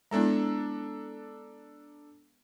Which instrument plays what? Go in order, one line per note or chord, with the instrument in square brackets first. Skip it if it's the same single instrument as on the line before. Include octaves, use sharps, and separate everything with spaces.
[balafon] G#3 B3 E4 [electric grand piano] D4 A4 A#5